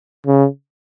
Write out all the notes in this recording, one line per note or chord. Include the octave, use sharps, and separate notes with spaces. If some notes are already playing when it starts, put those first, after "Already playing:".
C#3